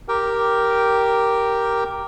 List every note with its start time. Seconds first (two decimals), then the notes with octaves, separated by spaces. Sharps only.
0.08 G4 A#4 G5